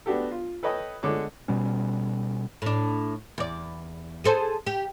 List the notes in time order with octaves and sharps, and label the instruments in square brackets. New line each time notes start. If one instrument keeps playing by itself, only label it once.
[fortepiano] B3 D4 F#4 G4 A4
F4
A4 B4 C#5 D#5 G5 D#6
D3 G#3 C#5 D6
[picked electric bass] B2 G3 C#4
[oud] A2 D4
E2 D5
G#4 A4 C5
G4